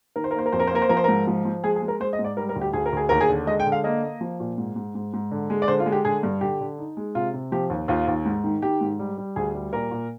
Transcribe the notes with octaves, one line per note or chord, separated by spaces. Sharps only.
D#3 A#4
C5
A#4
A#3 C5
A#4
F2 C5
A#4
C5
A#3 A#4
C5
F3 A#4
C5
G#2 A#4
F3
F3
G#3 G#4
G#4
G#3
A#4
G#3 C5
D#5
G#2
D5
G3 A#4
A#4
D2
G4
D2 G#4
A#4
D2 G#4
D#2 A#4
G#4
D3
G#3 D#5
G5
D3
F5
A#3 D#5
A#3
F3
A#2
G#2
G#2
G#2
G#2
D3
G#3
D5
D3 C5
F4
G#3
G4
D3 G#4
G2
D3 G4
D3
D#4
G#3
C3 F4
C3
F3 G4
D#2
D#2 F4
D#2
G#2
D#3
D#3 G4
G#2
G3
G3
D2 G#4
G3
A#2 A#4
A#2